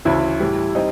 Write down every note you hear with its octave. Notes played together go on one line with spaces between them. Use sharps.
D2 C#3 E3 E4
A2 E3 G3
G3 C4 D#4